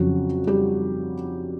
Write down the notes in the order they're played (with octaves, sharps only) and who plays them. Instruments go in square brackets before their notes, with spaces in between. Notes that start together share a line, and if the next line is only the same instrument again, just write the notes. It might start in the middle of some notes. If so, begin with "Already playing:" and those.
Already playing: [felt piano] F2 C#3 F#3 F#4
G3 G4